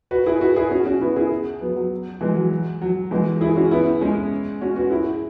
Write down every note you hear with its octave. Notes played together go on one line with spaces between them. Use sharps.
F#4 B4
E4 G#4
F#4 B4
E4 G#4
C#4 F#4
C#4 F#4
B3 E4
E4 G#4
F#3 B3
F#3
E3 G#3
F#3
F#3
E3 G#3
E4 G#4
C#4 F#4
B3 E4
G#3 C#4
C#4 F#4
F#4 B4
E4 G#4